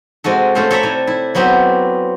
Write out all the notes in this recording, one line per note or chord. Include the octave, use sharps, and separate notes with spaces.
C3 G#3 F#4 A4
A3 C#4 A4 C5 F5
A4 C#5 D5 E5 A#5 B5
C3 E4
E4
F#3 B3 C4 F#4 G4